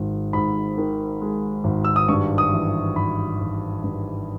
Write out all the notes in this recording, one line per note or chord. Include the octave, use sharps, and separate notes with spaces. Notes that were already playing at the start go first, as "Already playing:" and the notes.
Already playing: G#1 G#3
G#2 B5
D#3
G#3
G#1
E6
D#6
G2 C#6
D#6
E3
G#1 B5
G#1
G2